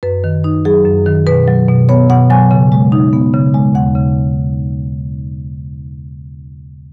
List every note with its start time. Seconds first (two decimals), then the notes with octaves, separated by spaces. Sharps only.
0.03 F#2 B4
0.24 D#3
0.44 D#4
0.65 F#3 G#4
0.85 F#2
1.06 D#3
1.27 B2 B4
1.48 F#3
1.68 B2
1.89 B3 C#5
2.09 B2 F#5
2.30 F#3 G#5
2.51 C#3
2.72 G#3
2.92 D#4
3.13 B3
3.33 C#3
3.54 G#3
3.75 D#2 F#5
3.95 C#3